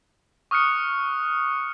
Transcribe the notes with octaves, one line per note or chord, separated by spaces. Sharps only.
C#6 D#6 F6 F#6 C#7